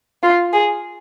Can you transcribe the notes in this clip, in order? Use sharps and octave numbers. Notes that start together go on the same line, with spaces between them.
F4
G#4